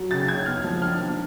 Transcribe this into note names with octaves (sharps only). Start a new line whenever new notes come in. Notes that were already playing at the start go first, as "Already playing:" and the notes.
Already playing: F#3
C#3 A6
C#4 G#6
B3 F6
F3
D4 F6
F3